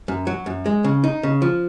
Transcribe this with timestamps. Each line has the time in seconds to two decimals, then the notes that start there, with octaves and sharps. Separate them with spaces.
0.08 F#2
0.27 F#3
0.46 F#2
0.66 G#3
0.84 C#3
1.04 D#4
1.23 C#3
1.42 F3